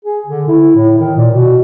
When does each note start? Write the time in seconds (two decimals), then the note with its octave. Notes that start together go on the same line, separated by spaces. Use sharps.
0.05 G#4
0.26 D3
0.48 E4
0.76 A2
0.98 D#3
1.17 A#2
1.32 B2